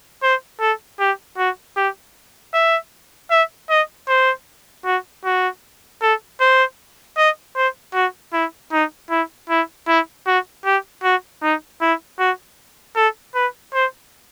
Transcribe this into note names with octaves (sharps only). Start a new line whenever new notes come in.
C5
A4
G4
F#4
G4
E5
E5
D#5
C5
F#4
F#4
A4
C5
D#5
C5
F#4
E4
D#4
E4
E4
E4
F#4
G4
F#4
D#4
E4
F#4
A4
B4
C5